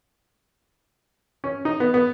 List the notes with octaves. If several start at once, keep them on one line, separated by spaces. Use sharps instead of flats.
C#4
D#4
B3
B3